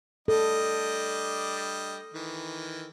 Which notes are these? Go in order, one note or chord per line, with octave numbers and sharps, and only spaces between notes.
G3 D4 A4 D#5
D#3 E3